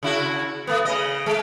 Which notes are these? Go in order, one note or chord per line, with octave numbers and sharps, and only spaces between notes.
C#3 E4 F#4
A3 B3
C#3 D#5
G#3